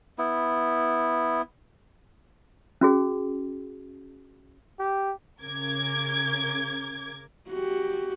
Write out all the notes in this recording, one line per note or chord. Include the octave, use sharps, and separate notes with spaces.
B3 E4
C#4 F#4 G#4
G4
C#3 A#4 D6 G#6
F#4 G4